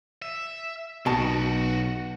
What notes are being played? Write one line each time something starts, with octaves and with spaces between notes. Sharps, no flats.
E5
B1 B2 F#4 G5 A5